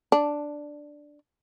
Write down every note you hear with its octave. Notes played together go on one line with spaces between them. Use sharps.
D4